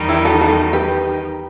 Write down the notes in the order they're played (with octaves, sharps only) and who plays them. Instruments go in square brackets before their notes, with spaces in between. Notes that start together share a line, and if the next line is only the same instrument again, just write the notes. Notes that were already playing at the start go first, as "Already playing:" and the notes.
Already playing: [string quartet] E2 D#3 G3 D#4
[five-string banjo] E4 G4
F#4 A4
F#4 A4
G4 B4